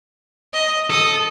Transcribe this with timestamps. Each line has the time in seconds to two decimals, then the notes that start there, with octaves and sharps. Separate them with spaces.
0.53 D#5
0.90 A4 D#6